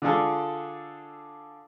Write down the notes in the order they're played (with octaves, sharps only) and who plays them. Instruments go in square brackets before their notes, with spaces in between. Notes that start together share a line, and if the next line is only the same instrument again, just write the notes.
[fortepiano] D3 D4 F4 G#4 A4